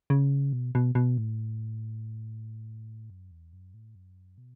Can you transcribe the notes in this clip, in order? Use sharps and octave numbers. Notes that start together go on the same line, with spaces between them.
C#3
B2
B2
B2
A2
F#2
E2
F#2
A2
F#2
B2